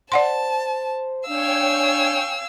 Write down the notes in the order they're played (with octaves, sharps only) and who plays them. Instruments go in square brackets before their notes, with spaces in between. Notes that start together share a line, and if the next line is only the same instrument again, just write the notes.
[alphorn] C5 [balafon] D5 F#5 C6 [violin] A5
[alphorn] D4 [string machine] C#5 G5 G#5 [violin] F5 E6